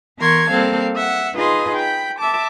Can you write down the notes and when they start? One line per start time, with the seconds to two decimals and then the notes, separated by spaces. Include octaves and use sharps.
0.19 E3 B3 A#4 C6 C#6 G#6
0.50 G3 A#3 C4 A4 F5
0.95 E5 F#5
1.35 D#4 F4 G#4 B4 D#5 C6
1.76 G5 B5
2.19 E5 A5 D6